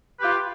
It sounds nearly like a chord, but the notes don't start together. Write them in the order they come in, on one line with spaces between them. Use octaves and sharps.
B4 G4 F4